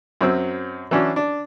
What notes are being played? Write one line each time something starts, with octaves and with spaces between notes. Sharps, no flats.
F#2 F#3 C4 E6
E3 F#3 C#4 D4
D4